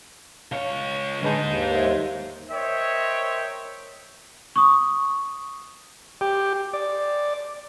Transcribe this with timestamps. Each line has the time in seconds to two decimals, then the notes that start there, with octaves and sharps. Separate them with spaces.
0.52 C#2 C#5 F5
1.23 G#2 D3 G#3 D#4 B4 A5
1.43 D#2
1.71 A#4 C5 E5
2.51 A#4 C5 C#5 D#5 E5 G5
4.56 C#6 D#6
6.21 G4
6.73 D5